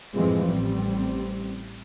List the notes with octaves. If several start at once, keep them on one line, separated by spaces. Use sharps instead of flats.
F#2 A2 E3 F3 G#3 C4
A1 G3 C4